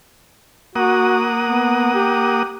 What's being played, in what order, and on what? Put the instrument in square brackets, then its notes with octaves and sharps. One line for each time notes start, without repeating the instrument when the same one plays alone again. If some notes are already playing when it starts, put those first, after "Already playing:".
[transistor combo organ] A#3 F#5 D#6 [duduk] F#4
[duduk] B3
G4